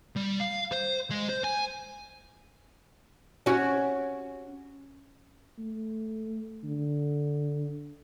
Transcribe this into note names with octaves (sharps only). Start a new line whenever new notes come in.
G3
F5
C5
G#3
C5
G#5
C#4 F#4
A3
D3